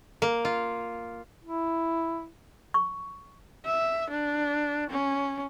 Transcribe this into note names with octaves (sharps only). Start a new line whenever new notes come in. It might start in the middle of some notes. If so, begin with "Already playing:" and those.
A#3
F4
E4
C#6
E5
D4
C#4